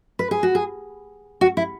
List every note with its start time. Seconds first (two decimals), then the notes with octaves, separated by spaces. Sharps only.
0.19 B4
0.31 G#4
0.43 F#4
0.55 G#4
1.41 F#4
1.57 E4